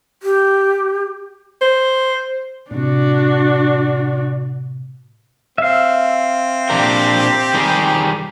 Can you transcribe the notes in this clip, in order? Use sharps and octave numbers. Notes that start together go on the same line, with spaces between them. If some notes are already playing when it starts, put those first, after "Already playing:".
G4
C5
A2 C3 D4 F#4
C4 E5 F5
A#2 D4 G4 A#4
D#3 G3 G#4